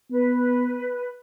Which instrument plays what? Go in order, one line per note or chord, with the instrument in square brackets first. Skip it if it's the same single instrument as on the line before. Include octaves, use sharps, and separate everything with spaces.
[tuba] B3 [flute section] B4